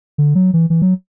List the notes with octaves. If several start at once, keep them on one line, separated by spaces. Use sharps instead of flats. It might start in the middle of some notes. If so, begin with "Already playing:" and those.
D3
F#3
E3
E3
F#3